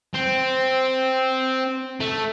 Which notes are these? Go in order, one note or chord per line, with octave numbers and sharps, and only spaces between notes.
C4
A3